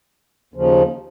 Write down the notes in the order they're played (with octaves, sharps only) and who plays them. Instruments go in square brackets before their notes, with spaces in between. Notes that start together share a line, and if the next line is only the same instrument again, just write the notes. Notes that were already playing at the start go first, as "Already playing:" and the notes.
[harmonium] D#2 C#3 F3